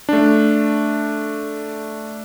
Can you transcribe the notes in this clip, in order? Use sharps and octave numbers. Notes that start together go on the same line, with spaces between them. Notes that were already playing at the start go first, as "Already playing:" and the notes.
A3 D4